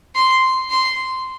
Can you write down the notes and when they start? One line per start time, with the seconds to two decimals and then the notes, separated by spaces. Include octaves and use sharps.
0.16 C6
0.70 C6